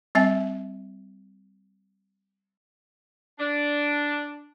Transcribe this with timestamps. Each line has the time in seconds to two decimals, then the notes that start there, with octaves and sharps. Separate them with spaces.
0.15 G3 C4 E5 G#5
3.39 D4